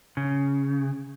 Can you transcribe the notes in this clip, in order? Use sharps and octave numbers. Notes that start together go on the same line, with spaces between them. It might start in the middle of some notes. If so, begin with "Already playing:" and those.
C#3